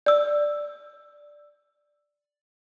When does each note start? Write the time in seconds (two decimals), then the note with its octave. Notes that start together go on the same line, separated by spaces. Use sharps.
0.06 D5 E6